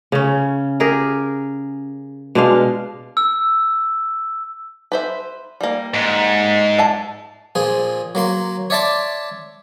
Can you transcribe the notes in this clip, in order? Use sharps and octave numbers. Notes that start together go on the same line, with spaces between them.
C#3 C#4
G4 G#4 A#4
B2 G#3 D4 F5
E6
B4 C5 E5
G3 A#3
G#2
E5 A5
A#2 F3 G#4
F#3 A#3 C6
C#5 D5 E5 A5 C6 D6